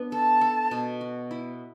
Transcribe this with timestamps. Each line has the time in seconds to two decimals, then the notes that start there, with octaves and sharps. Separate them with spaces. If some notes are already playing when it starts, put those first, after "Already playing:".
Already playing: B3 D4
0.12 A4 A5
0.41 A4
0.71 B2
1.01 F#4
1.31 E4